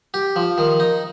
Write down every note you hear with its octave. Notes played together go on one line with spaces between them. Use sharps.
G4
F3
D#3
D#4